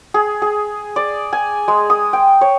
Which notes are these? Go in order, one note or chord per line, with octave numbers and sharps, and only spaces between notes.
G#4
G#4
D5
G#5
G#3
D#6
G5
C#5